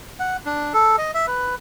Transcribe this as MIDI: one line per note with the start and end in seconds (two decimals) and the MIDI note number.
0.20 0.37 78
0.46 0.73 62
0.74 0.96 69
0.98 1.11 75
1.14 1.26 76
1.27 1.55 71